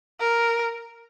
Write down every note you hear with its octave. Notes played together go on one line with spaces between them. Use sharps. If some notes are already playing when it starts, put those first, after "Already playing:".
A#4